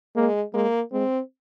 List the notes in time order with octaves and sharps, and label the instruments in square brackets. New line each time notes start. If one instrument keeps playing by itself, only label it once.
[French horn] G#3 [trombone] A#3
[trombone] G#3 [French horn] A#3
[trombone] G#3 [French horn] C4